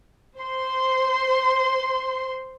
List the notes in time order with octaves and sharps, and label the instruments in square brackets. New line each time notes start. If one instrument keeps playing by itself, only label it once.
[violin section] C5 C6